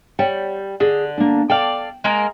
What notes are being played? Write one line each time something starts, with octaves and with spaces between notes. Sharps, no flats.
G3 C#5 F#5 G5
D3 G#4 D#5
A#3 D4
A4 D5 F5 G5
G#3 A#3 A#4